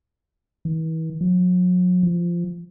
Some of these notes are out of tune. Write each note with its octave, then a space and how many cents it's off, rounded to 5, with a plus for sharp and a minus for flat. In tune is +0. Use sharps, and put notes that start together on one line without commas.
E3 -40
F#3 -40
F3 -15